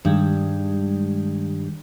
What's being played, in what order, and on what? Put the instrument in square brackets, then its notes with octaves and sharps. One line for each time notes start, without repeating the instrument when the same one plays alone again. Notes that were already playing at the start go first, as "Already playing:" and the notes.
[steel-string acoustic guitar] G2 [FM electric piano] D#3 G3 G#3